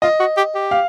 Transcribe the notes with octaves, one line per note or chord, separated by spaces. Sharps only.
F4 D#5
F#4
G4
G4
F5